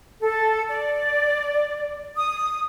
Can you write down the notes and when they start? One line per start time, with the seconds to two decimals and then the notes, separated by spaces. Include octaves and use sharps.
0.21 A4
0.69 D5
2.15 D#6